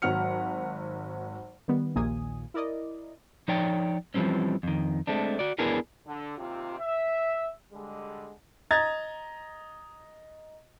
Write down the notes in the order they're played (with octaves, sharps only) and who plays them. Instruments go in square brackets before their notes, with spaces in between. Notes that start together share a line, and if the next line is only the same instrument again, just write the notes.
[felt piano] G#1 F#3 F#5 F6 C#7
[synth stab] D#3 G3 B3
A#1 D#2 A#2 A#3 G#5 D#6
E4 A#4 D5 D#5
[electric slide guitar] F3 D#4 C#5 D5 G5
E3 F3 G3 C4 C#4
F2 D#3
G#3 A3 C4 D4
F#4 D5
B3 D4 E4 G#4 A#4 B4
[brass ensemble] D3
D#2 C3 C4 F4
E5
D3 G3 G#3
[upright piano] D#5 A#5 G#6 A6